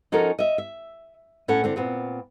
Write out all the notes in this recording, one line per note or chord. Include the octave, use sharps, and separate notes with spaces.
F3 C#4 D#4 F#4 A4 A#4
D#5 E5
E5
A2 C#4 A4 F#5
D3 C4 D4
A#2 B3 C4